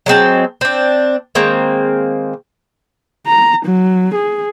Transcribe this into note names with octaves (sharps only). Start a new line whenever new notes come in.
F#3 G#3 C4 A5
C4 D4
D#3 G#3 A#3 C4
A#5
F#3
G#4